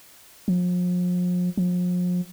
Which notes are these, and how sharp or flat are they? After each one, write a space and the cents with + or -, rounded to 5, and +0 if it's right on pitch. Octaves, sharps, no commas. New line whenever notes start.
F3 +40
F3 +40